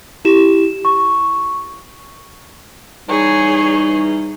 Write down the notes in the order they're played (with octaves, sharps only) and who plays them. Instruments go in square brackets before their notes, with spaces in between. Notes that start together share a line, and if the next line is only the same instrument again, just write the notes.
[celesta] E4 G4 E7
C#6
[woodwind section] E3 G3 D#4 [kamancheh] G#4 C#5